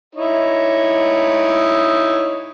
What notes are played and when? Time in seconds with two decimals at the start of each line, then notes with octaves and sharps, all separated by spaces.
0.15 D#4 E4 C#5